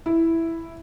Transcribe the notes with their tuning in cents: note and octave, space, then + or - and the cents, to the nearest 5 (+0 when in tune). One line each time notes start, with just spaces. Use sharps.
E4 +0